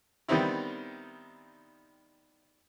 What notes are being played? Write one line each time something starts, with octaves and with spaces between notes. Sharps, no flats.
D#3 G3 B3 C4 D#4 E4